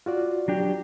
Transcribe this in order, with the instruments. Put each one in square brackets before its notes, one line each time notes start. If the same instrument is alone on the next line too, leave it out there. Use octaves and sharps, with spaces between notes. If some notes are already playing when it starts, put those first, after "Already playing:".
[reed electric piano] F4 F#4 D5
[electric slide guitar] F#3 D4 G4